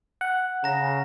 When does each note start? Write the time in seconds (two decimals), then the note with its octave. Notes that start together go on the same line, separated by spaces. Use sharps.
0.21 F#5
0.64 C#3 A#5 A#6